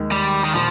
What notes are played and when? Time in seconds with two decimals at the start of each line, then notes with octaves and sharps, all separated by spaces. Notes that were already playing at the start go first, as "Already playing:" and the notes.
Already playing: D#2 D#3 G#3
0.11 G3
0.44 D#3
0.54 A#2 F3